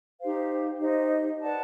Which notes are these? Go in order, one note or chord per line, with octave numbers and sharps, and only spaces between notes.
D#4 G4 C5 F5
D#4 G4 C5 D#5
B4 D5 F#5 A5